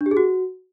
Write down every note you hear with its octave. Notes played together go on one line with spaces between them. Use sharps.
D4
G4
G#4
F#4